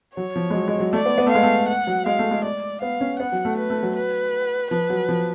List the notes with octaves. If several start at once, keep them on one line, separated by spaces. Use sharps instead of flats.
F#3 C#5
F3
G#3
F#3
G#3
F#3
A3 D5
B3
B3
A3
G#3 F5
A3
F#5
F#3
G#3 F5
A3
G#3
D5
B3 F5
C#4
B3 F#5
F#3
A3
B4
A3
F#3
B4
F3 B4
F#3
F3